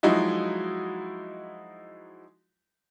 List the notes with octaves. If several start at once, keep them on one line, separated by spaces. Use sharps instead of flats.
F3 F#3 G#3 D#4 E4 F#4